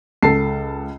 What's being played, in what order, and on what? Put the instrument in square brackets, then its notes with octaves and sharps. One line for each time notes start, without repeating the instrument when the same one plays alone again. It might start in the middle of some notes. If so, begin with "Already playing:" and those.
[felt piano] C#2 [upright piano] A4 A5 C7